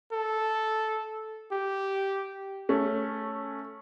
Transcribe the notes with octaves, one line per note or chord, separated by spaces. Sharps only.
A4
G4
A3 C#4